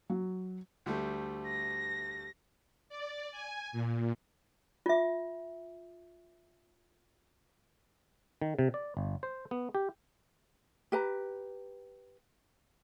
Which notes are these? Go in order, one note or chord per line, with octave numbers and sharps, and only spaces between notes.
F#3
D2 G3 A3
A#6
D5
G#5
A#2
F4 E5
D#3
C3
D5
G1
C5
B3
G4
G4 B4 A#5